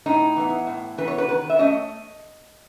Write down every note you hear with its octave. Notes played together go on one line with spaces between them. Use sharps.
A2 D#4
E3 B3
A2
E3 B3 B4
C#5
B4
D#3 B4
E5
A3 C#4 D#5